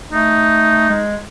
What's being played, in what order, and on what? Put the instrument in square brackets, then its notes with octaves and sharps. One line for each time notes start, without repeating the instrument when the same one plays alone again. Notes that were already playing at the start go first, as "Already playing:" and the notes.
[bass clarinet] A3 [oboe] D#4
[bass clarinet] G#3